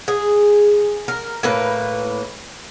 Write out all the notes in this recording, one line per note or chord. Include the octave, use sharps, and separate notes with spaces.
G#4
A#4
A2 A#3 B4